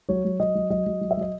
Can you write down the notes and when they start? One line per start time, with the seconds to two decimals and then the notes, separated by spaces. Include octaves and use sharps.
0.09 F#3 C#5
0.25 F#3
0.40 F#3 D#5
0.55 F#3
0.70 F#3 D#5
0.86 F#3
1.01 F#3
1.11 E5
1.17 F#3 D#5